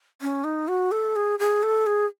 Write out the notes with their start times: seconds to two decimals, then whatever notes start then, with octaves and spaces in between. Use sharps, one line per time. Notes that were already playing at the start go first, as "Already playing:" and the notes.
0.22 C#4
0.44 D#4
0.68 F#4
0.91 A4
1.16 G#4
1.39 G#4
1.63 A4
1.86 G#4